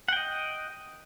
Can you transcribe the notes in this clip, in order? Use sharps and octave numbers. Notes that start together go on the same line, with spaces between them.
D#5 F#5 G5